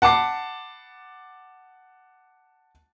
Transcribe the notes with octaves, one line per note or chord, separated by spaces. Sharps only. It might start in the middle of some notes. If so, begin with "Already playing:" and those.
F#5 A5 B5 D6 C7